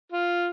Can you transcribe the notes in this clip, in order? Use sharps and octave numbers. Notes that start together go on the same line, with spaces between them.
F4